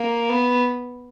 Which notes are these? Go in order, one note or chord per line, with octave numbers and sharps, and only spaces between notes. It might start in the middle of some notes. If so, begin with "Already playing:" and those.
Already playing: A#3
B3